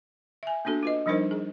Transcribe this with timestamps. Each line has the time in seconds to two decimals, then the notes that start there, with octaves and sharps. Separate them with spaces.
0.43 E5 G#5
0.65 A#3 B3 D4 F#4 A4
0.83 F4 B4 D#5
1.06 F3 G3 D4 D#4 A#4 C5
1.31 G#4